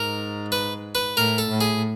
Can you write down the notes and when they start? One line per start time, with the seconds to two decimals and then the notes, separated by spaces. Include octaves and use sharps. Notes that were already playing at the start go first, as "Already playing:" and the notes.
Already playing: G#2 A#4
0.52 B4
0.95 B4
1.17 A2 A#4
1.38 A4
1.50 A2
1.61 G#4